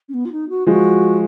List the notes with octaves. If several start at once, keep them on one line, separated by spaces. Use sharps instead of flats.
C#4
B3
F4
D#4
F#4
F3 G#3 F#4